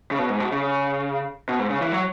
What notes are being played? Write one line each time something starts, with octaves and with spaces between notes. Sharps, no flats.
C#3
B2
G#2
B2
C#3
B2
G#2
C#3
E3
F#3